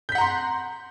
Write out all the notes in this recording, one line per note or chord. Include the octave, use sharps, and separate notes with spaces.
F#5 A#5 C6 G6 B6